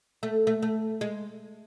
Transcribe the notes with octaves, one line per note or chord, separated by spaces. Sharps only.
A3
A3
A3
G#3